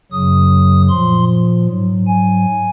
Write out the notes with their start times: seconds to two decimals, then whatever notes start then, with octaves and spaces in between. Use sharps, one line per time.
0.12 F#2 C#3 F#3 D#6
0.90 A#2 F3 C6
1.68 G#2 F#3
2.07 G#5